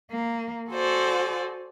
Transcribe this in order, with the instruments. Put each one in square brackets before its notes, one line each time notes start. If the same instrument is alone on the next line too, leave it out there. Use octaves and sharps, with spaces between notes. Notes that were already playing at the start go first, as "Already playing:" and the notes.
[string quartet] A#3
F#4 A4 C5 D5 G#5